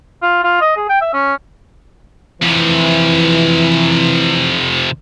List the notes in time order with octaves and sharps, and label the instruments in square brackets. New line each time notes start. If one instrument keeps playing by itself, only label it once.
[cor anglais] F4
F4
D#5
G#4
G5
E5
C#4
[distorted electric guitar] F2 C3 [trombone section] E3